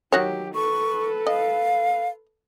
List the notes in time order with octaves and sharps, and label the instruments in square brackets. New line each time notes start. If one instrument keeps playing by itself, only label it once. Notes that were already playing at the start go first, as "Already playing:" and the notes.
[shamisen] D#3 F#4 C#5 [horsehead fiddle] F#3 G4
[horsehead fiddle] A4 B4 [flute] C#6
[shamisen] D#5 [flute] F5